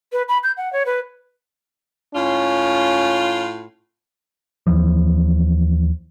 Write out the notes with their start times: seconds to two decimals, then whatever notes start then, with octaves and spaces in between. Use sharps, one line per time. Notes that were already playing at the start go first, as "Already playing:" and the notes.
0.12 B4
0.29 B5
0.43 G6
0.57 F#5
0.73 C#5
0.86 B4
2.14 A2 C#4 F4
4.67 D#2 E3 F3